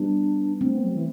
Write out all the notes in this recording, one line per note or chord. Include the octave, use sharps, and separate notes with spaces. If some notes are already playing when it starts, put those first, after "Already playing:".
Already playing: G3 B3 D4
A3 C4 D4
B3
F#3
E3